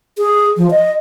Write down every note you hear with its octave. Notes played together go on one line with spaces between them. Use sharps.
G#4
F3
D#5